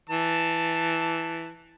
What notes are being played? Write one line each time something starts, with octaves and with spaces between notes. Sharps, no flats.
E3 A5